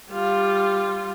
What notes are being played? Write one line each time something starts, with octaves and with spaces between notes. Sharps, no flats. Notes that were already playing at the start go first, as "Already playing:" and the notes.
G3 F4